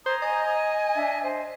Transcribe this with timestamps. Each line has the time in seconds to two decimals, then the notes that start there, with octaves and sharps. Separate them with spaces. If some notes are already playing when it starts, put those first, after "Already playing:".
0.06 C5 A#5 D#6 G#6
0.22 D#5 G#5
0.95 D4 E5
1.23 C5